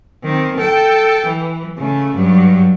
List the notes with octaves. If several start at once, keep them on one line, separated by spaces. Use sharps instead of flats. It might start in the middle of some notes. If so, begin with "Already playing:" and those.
D#3 C4
A4 G5
E3
C#3 A3
G2 F#3